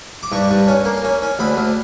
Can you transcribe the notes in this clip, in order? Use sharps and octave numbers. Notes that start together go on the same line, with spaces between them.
D6
G2 C#6
G2
C#4
A#3
C#4
C#4
D2 B5
D2